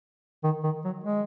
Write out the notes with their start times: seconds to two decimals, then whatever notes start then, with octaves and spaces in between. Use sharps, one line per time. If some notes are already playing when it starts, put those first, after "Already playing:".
0.44 D#3
0.64 D#3
0.84 F#3
1.04 G#3